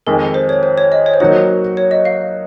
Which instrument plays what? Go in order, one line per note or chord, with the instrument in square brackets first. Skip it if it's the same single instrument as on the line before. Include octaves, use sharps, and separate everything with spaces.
[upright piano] F2 D#3 G#3 [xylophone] A#4
[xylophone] C5
C#5
C5
C#5
D#5
C#5
C5
[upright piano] F#3 A#3 D#4 F#4 [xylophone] C#5
[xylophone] C#5
D#5
F5